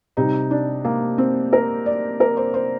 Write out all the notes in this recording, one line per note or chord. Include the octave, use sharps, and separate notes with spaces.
C3 G3 D#4
D4
A#3
C4
A#4
D5
A#4
C5
C5